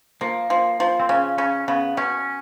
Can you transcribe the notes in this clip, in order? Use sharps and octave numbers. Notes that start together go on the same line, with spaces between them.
F3 A#3
F3
F3
C4
C#3 C#4
C#3 C#4
C#3 B3
B2 C#4